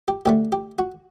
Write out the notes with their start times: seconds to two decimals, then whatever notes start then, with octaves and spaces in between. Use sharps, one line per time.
0.08 G4
0.26 D2 D3 A3 G4
0.52 G4
0.79 F#4